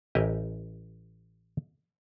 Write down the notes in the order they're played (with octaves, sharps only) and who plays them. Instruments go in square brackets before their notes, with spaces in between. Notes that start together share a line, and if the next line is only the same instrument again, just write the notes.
[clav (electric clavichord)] A1 E4 G4 A#4 D#5 G#5